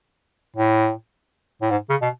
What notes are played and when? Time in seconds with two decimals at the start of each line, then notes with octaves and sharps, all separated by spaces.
0.57 A2
1.61 A2
1.71 G#2
1.89 C#3
2.02 B2